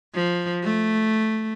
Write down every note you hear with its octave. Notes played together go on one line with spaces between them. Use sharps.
F3
A3